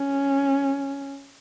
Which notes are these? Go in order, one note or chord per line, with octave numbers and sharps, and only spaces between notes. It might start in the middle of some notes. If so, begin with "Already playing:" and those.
Already playing: C#4